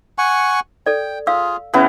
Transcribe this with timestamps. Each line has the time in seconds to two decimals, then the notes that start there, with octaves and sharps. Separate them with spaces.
0.18 F#5 G#5 C#6
0.86 A4 D5 G5
1.27 F4 G#4 F5 E6
1.73 C#3 E3 B3 E5